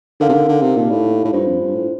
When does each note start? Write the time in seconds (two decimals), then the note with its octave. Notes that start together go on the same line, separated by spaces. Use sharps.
0.20 D3 D#4 A#4 F5
0.29 C3
0.33 D3
0.48 D3
0.62 C3
0.76 A#2 D#4 G4 D5 F5 A5
0.90 A2
1.25 A2
1.33 G2 D4 F4 C5
1.47 F2
1.61 G2
1.75 A2